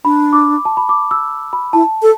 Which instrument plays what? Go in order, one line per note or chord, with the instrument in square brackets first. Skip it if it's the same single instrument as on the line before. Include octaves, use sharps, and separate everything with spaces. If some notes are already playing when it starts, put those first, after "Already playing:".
[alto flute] D4 [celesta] B5
[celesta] D6
A5
B5
D6
E6
B5
[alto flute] E4 [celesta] A5
[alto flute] A4